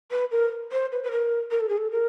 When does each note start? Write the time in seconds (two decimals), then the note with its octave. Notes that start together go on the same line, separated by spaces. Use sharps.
0.11 B4
0.31 A#4
0.72 C5
0.92 B4
1.04 B4
1.11 A#4
1.51 A#4
1.61 A4
1.69 G#4
1.78 A4
1.92 A#4